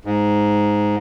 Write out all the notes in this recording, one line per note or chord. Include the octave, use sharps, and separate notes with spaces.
G#2